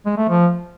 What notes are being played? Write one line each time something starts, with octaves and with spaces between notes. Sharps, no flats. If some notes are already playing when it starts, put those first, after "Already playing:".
G#3
A3
F3